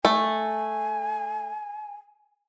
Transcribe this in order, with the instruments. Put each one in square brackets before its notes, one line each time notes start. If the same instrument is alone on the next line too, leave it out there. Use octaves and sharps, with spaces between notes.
[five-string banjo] A3 [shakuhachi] G#5